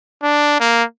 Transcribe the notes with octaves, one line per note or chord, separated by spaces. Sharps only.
D4
A#3